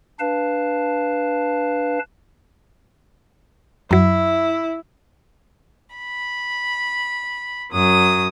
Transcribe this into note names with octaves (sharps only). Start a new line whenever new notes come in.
D4 B4 F5 A5
F#2 F#3 E4
B5
F#2 F#3 D#6